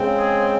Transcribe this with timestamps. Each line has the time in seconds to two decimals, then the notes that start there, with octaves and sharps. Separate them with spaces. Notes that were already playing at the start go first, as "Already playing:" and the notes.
Already playing: C#3 G#3 C4
0.18 G#4